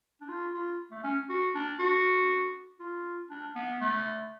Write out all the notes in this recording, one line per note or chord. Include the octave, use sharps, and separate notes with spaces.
D4
F4
F4
A3
C#4
F#4
D4
F#4
F4
D4
B3
A3